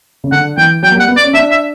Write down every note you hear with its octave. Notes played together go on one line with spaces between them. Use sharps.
C#3
D3 F#5
E3 G5
F#3 G5
A#3
G3
F#5
B3
D5
C#4
D4 E5
E5